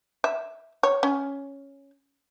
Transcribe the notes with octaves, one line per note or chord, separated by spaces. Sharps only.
E5
C#5
C#4